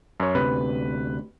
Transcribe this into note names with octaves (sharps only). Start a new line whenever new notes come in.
F#2 C#5
D2 C3 B4